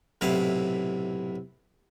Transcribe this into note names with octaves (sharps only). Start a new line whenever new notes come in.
B1 A2 C3 E4 F5